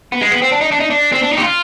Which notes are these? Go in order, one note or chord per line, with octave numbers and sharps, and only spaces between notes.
B3
G#3
B3
C4
D4
D#4
D4
D#4
D4
C4
D4
D#4 G4
F4